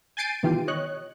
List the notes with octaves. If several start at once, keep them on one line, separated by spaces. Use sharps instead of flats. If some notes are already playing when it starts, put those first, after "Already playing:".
G#5 G6 A6 C7 D7 D#7
B2 D#3 E3 F4 G4
C#5 D#5 F#6